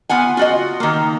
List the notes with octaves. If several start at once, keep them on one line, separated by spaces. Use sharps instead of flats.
B3 F4 F#5 G#5
F4 F#4 D#5
D#3 A#3